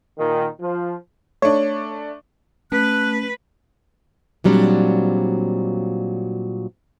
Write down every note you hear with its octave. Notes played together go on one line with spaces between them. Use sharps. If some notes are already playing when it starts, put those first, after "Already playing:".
A#2 D#3
F3
A3 D4 C#5
A3 C#4 B4 F#6
A#2 F#3 G3 C4 D4